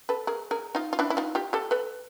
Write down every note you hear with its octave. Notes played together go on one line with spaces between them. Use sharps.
A4 B4
G#4 A#4
G#4 A#4
D#4 F4
F4
D4 E4
E4
D#4 F4
F4 G4
G4 A4
A4 B4